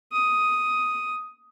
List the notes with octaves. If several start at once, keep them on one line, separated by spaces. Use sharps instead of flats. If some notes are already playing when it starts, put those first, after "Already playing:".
D#6